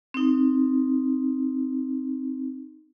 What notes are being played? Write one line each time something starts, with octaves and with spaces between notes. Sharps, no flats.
C4 D#4